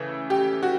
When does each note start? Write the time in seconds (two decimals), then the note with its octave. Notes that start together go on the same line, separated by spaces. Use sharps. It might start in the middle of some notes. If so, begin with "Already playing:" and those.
Already playing: C#3 E3 A3
0.30 G4
0.63 F#4